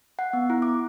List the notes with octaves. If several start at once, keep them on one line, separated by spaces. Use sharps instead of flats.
F#5
B3
E4
D6